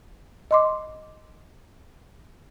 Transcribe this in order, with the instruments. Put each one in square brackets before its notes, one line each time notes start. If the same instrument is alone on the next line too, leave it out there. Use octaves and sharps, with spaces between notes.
[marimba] D#5 C6 D6